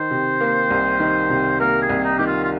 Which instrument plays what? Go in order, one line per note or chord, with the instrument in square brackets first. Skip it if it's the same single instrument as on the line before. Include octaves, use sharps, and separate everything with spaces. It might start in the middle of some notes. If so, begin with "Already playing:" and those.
Already playing: [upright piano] D#3 [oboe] C5
[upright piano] C3
A#3
C2
D#3
C3
[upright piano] A#3 [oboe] A#4
[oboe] G#4
[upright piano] C2
[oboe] D#4
[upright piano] D#3 [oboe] G4
[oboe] F4
F4